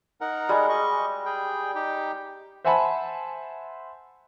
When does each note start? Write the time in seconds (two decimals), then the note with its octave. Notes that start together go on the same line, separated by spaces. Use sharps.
0.21 D#4 A#4 F#5
0.49 G3 G#3
0.69 D#5 C#6
1.26 G#4 G5
1.75 D#4 G4 G5
2.65 C5 E5 F#5 G#5 A5 B5